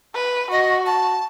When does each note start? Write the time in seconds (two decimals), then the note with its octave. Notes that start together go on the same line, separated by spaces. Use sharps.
0.15 B4
0.51 F#4 D#5
0.86 A5